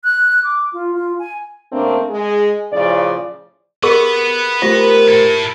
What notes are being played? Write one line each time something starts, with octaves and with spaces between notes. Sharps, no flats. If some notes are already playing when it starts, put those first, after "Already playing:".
F#6
D6
F4
F4
G#5
C#3 A3 A#3 C4 D4
G#3 G#4
A2 C#3 F3 D5
G4 G#4 A#4 B4 F#5
A3 F4 G4 A#4 C5
E4 A4